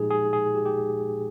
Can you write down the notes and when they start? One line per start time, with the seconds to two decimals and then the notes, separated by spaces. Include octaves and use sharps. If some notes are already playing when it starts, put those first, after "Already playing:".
Already playing: A#2 F3 G#3 D#4 G4 G#4
0.10 G#4
0.33 G#4
0.55 G4
0.65 G4